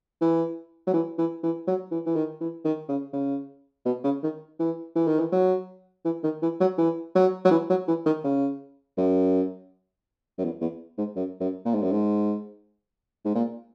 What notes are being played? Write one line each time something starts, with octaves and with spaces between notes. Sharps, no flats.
E3
F#3
E3
E3
E3
F#3
E3
E3
D#3
E3
D#3
C#3
C#3
B2
C#3
D#3
E3
E3
D#3
E3
F#3
E3
D#3
E3
F#3
E3
F#3
F#3
E3
F#3
E3
D#3
C#3
F#2
F#2
E2
E2
G#2
F#2
F#2
A#2
G#2
F#2
G#2
G#2
A#2